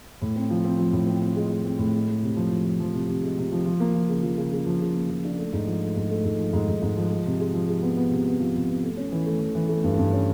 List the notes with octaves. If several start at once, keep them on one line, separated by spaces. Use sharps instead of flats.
A2
C4
F3
C4
F3
A2
C4
C4
G#3
G#3
C4
A2
G#3
G#3
C3
F3
F3
F3
F3
C3
C3
G#3
C3
F3
F3
A#3
F3
C#3
F3
C#3
C#3
F3
C#3
A#3
F3
D4
A3
G#2
F3
A3
G#2
A3
G#2
F3
G#2
G#2
G#2
F3
G#3
C3
G#3
F3
G#3
B3
B3
C3
B3
F3
C3
B3
A3
C#4
E3
A3
E3
E3
A3
G2
G2
C#4